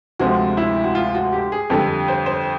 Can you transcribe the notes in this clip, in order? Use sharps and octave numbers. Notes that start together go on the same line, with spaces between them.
D2 C3 F3 G#3 F#4
E4
F#4
F4
F#4
G4
G#4
F2 D3 G3 A4
C5
C5